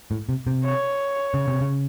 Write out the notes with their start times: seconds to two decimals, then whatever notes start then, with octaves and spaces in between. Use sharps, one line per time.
0.11 A2
0.29 C3
0.47 C3
0.64 C#5
1.34 C#3
1.48 C3
1.61 C#3